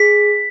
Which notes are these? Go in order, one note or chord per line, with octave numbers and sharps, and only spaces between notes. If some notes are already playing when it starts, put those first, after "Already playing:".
Already playing: G#4 B6